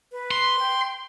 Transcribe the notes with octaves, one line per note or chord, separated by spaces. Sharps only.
B4
C6
G5